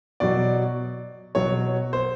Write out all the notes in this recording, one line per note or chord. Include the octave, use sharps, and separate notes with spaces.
B2 F#3 D5
B2 F#3 C#5
C5